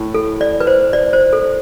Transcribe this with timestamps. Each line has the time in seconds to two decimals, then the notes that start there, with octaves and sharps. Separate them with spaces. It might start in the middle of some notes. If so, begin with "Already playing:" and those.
Already playing: A2
0.14 A4
0.41 D5
0.60 B4
0.67 C5
0.93 D5
1.13 C5
1.33 A4